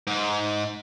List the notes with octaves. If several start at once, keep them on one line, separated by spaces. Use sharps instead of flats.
G#2